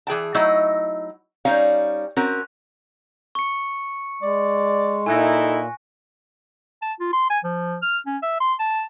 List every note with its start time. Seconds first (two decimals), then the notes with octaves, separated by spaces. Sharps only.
0.07 E3 G#4 G5 A5
0.35 F#3 A3 D#4 E4 D#5
1.45 G3 C#4 D#4 C#5 F5
2.17 C4 C#4 F#4 A#4
3.35 C#6 C#7
4.22 G#3 D5
5.06 A#2 D#4 E4 A4 G#5 F#6 A#6
6.82 A5
7.00 F4
7.13 C6
7.30 G#5
7.44 F3
7.83 F6
8.06 C#4
8.22 E5
8.41 C6
8.60 A5